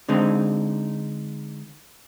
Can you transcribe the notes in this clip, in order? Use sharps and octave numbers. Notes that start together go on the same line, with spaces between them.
D3 G#3 C4 D#4